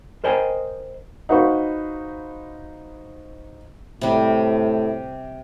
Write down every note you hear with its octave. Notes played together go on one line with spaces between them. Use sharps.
A#4 C5 D#5 G5 G#5
D#4 F#4 B4 C5 F5 C#6
A2 C3 G3